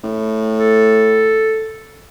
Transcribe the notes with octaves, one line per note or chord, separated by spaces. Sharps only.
A2
A4